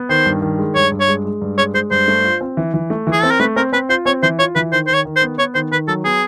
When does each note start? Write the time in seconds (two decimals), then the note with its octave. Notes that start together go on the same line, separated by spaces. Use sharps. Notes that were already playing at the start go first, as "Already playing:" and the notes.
Already playing: B3
0.09 D#3 C5
0.26 G2
0.42 D#3
0.59 G#3
0.75 G2 C#5
0.92 G2
1.00 C#5
1.08 G#3
1.25 G#3
1.41 G2
1.58 G#3 C#5
1.74 G#3 C5
1.91 G2 C5
2.08 A3
2.24 F4
2.41 C4
2.57 E3
2.74 E3
2.90 A3
3.07 E3
3.12 G#4
3.22 C4 A4
3.31 A#4
3.40 A3 B4
3.56 C4 A#4
3.73 C4 B4
3.89 F4 C5
4.06 C4 C#5
4.23 E3 C5
4.39 F4 C#5
4.55 E3 B4
4.72 D#3 C5
4.87 D#3 C5
4.94 C#5
5.05 D#3
5.16 C5
5.22 B3
5.38 B3 C#5
5.54 D#3 C5
5.71 D#3 B4
5.88 F#3 A4
6.04 B3 G#4